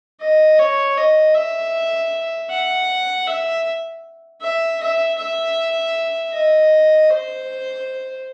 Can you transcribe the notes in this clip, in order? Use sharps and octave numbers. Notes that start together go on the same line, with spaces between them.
D#5
C#5
D#5
E5
F#5
E5
E5
E5
E5
D#5
C5